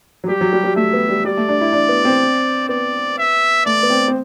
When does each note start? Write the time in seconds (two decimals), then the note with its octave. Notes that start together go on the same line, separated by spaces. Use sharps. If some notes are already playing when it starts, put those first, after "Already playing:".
0.24 F#3
0.28 G3 G4
0.41 F#3
0.53 G3
0.64 G3
0.76 A3 E5
0.93 B3
1.09 G3
1.25 G3 D5
1.37 A3
1.49 D4
1.61 E4
1.73 D4
1.89 B3
2.05 C4
2.69 B3 D5
3.18 E5
3.66 A3 D5
3.83 B3
3.90 C4
4.08 C4